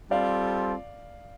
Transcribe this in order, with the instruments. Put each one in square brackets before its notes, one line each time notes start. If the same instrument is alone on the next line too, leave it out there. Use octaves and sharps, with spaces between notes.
[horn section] G3 C4 F4 A4 [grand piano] D5 F5